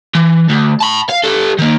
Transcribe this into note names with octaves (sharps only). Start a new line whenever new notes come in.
E3
D2
A5 B5
F5
G3 A4
D#3 A#3